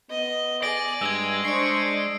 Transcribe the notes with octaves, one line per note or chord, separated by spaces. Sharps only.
B3 D#5
G#4 D5 A#6 D7 F#7
G2 G#3 E6 G#6
D4 C5 C#6 C7 D7